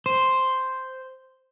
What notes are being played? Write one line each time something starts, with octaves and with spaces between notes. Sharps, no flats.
C5